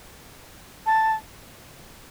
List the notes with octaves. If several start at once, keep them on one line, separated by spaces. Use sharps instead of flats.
A5